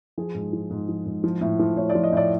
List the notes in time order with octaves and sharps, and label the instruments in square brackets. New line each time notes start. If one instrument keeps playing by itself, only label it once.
[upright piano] F3 G#4
G#2
F3
G#2
F3
G#2
F3
A2
F3
A2 C#5
D5
F3
D#5
A2 D5